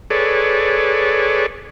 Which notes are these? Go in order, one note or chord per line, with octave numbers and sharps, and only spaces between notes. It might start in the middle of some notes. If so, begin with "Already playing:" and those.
G#4 A4 B4 C#5 D5